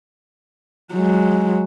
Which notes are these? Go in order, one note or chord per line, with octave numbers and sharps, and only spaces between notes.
F#3 G#3